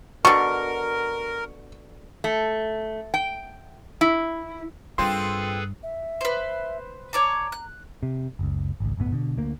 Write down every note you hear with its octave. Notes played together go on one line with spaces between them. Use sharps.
B2 D3 A#4 C#6
A3
G5
E4
G2 C4 F4 G#4 A4 B4 C6
E5
B4 C5
C#5 D5 A5 A#5
F#6
C3
F#1 C#2
G#1 C#2
D1 G1 A2 B3
B2 D3
D2 A#3